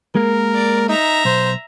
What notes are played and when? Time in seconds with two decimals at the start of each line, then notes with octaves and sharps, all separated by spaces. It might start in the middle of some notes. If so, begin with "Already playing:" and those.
0.15 G#3 A#3 A#4
0.54 D5
0.89 D#4 E5 A#5
1.25 B1 C5